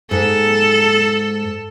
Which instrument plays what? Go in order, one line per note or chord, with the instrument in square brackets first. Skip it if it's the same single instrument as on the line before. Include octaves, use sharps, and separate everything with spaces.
[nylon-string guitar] G#2 [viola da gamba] A4